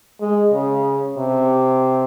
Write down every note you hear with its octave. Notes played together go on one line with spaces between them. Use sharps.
G#3
C#3
C3